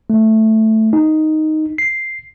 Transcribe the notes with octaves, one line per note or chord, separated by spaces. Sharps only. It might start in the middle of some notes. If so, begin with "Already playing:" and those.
A3
D#4
C7